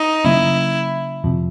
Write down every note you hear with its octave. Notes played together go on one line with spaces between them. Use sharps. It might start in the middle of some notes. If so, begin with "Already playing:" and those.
Already playing: D#4
C#3 F#3 A#3 C#4 E4
F2 C3 F3